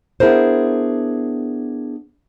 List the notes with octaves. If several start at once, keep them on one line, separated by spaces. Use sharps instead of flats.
B3 D4 E4 G#4 A#4 C5